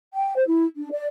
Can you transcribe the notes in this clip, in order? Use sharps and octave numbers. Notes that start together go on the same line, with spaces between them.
G5
C5
E4
D4
D5